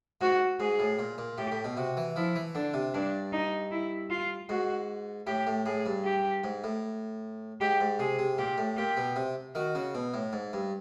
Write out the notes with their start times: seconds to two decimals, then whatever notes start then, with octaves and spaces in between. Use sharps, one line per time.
0.21 G#2 F#4
0.60 G#2 G#4
0.79 A2
0.99 A#2
1.18 A#2
1.38 A2 G4
1.52 A2
1.64 B2
1.77 C3 F#4
1.97 E3
2.16 F3 E4
2.36 E3
2.55 D3 D4
2.74 C3
2.94 G2 D4
3.32 D#4
3.71 E4
4.10 F4
4.49 G#2 F#4
5.27 A2 G4
5.47 A2
5.66 A2 G#4
5.86 G2
6.05 G4
6.44 G#2
6.64 A2
7.61 G#2 G4
7.80 G#2
7.99 C3 G#4
8.19 C3
8.38 A#2 G4
8.58 A2
8.77 A#2 G4
8.97 B2
9.16 C3
9.55 D#3 F#4
9.75 C#3
9.95 B2
10.14 A2
10.33 G#2
10.53 G2